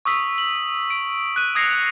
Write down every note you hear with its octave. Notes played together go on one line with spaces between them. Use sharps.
C#6 D#6 E6 B6
F#7
D7
F#6 D#7
D#6 G#6 A#6 C7 C#7 F7